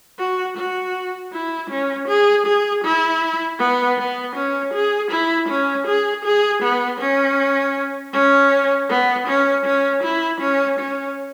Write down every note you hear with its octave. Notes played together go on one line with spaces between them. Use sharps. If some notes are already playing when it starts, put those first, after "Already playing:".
F#4
F#4
E4
C#4
G#4
G#4
E4
B3
B3
C#4
G#4
E4
C#4
G#4
G#4
B3
C#4
C#4
B3
C#4
C#4
E4
C#4
C#4